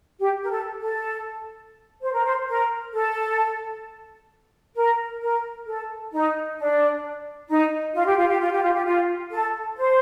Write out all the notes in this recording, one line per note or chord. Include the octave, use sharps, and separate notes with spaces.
G4
A#4
A4
A4
C5
A#4
C5
A#4
A4
A#4
A#4
A4
D#4
D4
D#4
F4
G4
F4
G4
F4
G4
F4
G4
F4
A4
C5